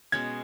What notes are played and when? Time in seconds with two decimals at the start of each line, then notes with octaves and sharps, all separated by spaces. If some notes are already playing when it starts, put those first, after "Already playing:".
0.12 B2 G#3 C#4 G#6